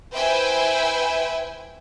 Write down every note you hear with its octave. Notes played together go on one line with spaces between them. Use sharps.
E4 B4 C5 E5 G5 G#5